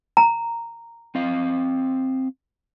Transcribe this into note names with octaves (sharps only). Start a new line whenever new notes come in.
A#5
C4 D#5 F5